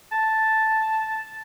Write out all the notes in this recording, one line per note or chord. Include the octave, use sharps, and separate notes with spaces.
A5